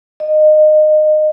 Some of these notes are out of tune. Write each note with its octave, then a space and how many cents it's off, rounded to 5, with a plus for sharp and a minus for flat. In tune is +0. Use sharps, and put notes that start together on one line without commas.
D#5 -20